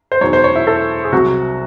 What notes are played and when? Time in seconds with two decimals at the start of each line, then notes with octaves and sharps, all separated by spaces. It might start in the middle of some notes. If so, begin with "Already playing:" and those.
0.12 C5
0.21 E1 E2 D#3 F#3 C#5
0.33 C5
0.44 C#5
0.56 E4
0.67 A4
1.04 G#4
1.12 C2 C3 F#3 F#4